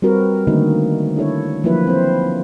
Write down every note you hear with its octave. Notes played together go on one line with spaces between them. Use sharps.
G3 C4 F#4 A#4 B4
D3 D#3 A3 A#3 D#4 F#4
D4 E4 A4 C#5
F3 F#3 A#3 E4 F#4 B4
C4 C5